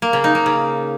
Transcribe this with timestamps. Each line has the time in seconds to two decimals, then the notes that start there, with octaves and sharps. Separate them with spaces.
0.02 A#3
0.13 C#3
0.24 D#4
0.35 A#3
0.46 C#3